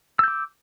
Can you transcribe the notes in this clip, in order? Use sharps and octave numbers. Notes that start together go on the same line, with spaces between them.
D6 E6 G6